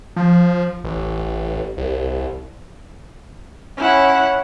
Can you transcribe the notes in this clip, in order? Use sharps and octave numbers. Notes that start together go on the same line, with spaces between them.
F3
A1
C2
C#4 E4 F#5